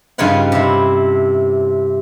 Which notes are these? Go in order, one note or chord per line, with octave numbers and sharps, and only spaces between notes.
G2 C#3 D#4 F4 C#5 F#5
C3 E4